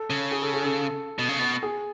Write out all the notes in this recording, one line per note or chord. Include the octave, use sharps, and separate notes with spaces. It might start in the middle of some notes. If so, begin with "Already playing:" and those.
Already playing: A4
C#3
G#4
A4
G#4
A4
B2
C#3
B2
G#4